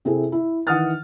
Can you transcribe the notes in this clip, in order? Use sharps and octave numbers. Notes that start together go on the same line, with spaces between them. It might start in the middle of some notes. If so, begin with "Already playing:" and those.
C3 C4 E4 G#4 A4
E4
D#3 E3 F#5 D#6 F6 A6